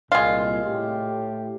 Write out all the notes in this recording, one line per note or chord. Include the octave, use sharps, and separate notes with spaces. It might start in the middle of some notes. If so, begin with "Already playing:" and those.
C2 A#2 G#3 F4
A2 G4